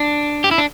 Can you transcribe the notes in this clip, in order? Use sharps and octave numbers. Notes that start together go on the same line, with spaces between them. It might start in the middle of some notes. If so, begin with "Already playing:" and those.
Already playing: D4
G4
E4
D4